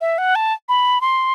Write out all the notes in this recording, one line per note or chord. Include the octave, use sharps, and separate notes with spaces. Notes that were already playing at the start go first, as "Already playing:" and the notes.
E5
F#5
A5
B5
C6